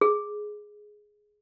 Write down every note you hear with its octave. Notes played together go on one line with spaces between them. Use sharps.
G#4